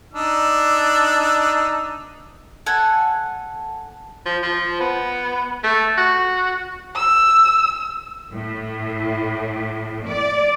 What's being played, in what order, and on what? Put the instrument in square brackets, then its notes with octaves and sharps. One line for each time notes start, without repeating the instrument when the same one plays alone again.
[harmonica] D4 D#4 E6
[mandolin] A4 F#5 G#5
[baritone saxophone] F3
F3
B3
A3
F#4
[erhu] E6
[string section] A2
D5